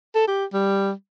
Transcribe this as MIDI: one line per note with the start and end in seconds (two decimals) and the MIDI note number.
0.15 0.27 69
0.28 0.45 67
0.53 0.91 55